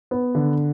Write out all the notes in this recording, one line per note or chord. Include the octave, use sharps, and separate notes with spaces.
B3
D3